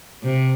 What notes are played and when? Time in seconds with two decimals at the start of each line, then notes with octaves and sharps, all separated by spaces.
0.24 C3